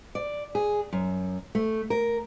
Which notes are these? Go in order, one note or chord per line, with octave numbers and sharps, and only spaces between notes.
D5
G#4
F#2
A3
A#4